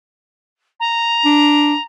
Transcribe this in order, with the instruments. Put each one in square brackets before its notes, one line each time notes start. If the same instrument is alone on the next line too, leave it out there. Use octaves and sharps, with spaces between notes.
[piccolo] A#5
[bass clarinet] D4